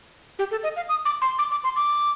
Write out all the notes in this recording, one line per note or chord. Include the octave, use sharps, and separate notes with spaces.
G4
A4
D#5
F5
D#6
D6
C6
D6
D6
C6
D6